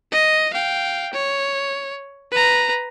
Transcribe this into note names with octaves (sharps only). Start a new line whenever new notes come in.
D#5
F5 G5
C#5
B4 A#5